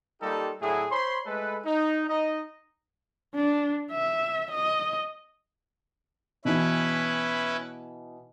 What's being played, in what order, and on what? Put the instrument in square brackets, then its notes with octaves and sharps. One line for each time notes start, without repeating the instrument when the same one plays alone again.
[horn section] G3 A#3 D#4 F4 G4 A4
A2 D3 F#3 E4 G#4
C5 C#5 B5 C6
G#3 A3 A4 B4
D#4
D#4 D#5
[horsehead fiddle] D4
E5
D#5
[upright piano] B2 E3 [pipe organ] C#4 E4 B4